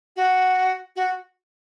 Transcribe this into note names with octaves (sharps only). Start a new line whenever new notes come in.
F#4
F#4